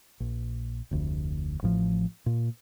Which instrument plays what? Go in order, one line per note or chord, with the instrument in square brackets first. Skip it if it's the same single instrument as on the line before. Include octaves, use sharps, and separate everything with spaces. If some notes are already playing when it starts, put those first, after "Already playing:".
[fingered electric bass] A#1
F1 D2
A1 A2 F3
A#2